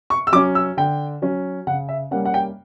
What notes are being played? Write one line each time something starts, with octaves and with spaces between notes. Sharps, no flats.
C#6
E6
F#3 C#4 D6
E6
D3 G5
F#3 C#4
C#3 F#5
E5
G3 A#3 C#4 F#5
F#5
G5